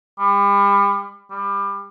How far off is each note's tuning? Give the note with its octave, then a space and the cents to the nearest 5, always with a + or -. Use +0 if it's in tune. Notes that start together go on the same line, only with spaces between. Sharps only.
G3 +35
G3 +25